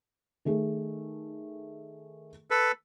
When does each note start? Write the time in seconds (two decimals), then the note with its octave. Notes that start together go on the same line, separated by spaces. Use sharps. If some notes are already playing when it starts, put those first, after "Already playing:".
0.45 D#3 A3 G#4
2.51 A4 B4